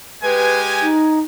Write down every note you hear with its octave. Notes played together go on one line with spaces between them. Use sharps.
G#3 G4 B4 G#5
D#4